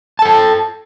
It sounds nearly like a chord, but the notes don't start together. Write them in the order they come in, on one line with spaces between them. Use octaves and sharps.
A5 A4 G5